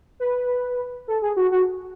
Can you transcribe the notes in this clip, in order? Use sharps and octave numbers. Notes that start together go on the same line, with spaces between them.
B4
A4
G#4
F#4
F#4